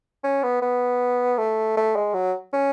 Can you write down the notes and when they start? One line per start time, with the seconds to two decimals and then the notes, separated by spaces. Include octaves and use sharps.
0.24 C#4
0.43 B3
0.62 B3
1.38 A3
1.77 A3
1.96 G#3
2.14 F#3
2.53 C#4